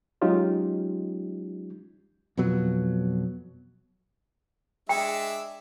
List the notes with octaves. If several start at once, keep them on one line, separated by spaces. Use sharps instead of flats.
F#3 G#3 C#4 D#4 F4 G4
F2 B2 F#3
G#3 D4 E5 G5